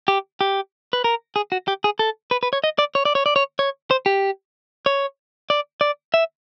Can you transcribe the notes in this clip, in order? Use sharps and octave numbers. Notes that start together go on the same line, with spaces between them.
G4
G4
B4
A#4
G#4
F#4
G4
G#4
A4
B4
B4
C#5
D#5
D5
C#5
D5
C#5
D5
C#5
C#5
C5
G4
C#5
D5
D5
E5